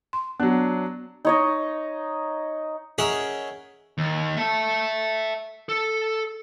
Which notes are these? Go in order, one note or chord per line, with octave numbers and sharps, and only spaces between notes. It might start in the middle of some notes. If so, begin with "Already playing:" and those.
C6
F#3 B3 D4
D#4 C#5 D#5
C#4 G#4 A#4 D#5 E5 F#5
D#2
E5 A5
A4